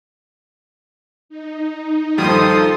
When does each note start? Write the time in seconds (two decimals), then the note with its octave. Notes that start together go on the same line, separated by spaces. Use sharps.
1.29 D#4
2.18 G2 D#3 F3 G3 A4 C6 D#6